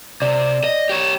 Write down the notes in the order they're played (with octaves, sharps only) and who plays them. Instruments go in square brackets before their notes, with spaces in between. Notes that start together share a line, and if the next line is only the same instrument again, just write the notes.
[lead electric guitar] C3 [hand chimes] D5
[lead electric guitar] D#5
G4 C#5